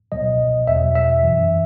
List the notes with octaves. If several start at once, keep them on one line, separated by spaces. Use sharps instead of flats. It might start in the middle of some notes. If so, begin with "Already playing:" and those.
C#2 B2 F#3 D#5
E2 B2 F#3 E5
E5
F#2 E3